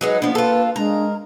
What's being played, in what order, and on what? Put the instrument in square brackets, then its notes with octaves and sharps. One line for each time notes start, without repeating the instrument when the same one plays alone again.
[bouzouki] F#3 G#3 D#4 [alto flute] B4
[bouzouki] F3 B3 [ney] A#3 [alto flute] D4
[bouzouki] F4 A4 [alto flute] B4
[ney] G#3 [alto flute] D4 [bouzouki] A#4